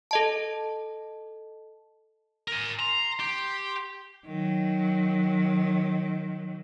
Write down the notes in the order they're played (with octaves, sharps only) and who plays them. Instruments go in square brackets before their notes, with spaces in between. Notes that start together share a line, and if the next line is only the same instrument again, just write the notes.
[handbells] A4 D#5 A5
[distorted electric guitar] A#4 G#5
[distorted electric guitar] A#5 [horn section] C6
[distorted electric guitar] G4
[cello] D#3 F#3